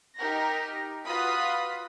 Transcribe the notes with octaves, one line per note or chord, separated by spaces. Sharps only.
D#4 G4 A#4 A#6
F4 F#4 B4 B5 D#6